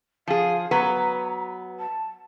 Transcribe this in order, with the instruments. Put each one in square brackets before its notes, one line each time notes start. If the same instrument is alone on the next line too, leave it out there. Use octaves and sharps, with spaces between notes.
[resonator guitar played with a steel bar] F3 G#4 [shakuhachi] F5
[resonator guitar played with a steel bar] F#3 B3 B4 [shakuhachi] A#5
[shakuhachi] A5